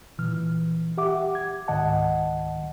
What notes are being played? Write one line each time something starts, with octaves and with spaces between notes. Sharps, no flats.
A#2 E3 F6
G4 E5 F#5 D6
G#6
C#2 G#2 D#3 D#5 F#5 A5